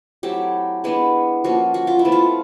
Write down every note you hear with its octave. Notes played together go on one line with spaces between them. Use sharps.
F#3 A3 C4 E4 G4
E3 G#3 B3 D4
F3 A#3 C#4 F#4
F#4
F4
E4
E3 A3 C4
F4